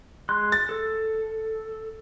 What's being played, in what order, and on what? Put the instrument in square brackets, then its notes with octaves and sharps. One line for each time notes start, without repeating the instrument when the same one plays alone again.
[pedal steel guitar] G#3 C6 F#6
[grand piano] A6
[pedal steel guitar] A4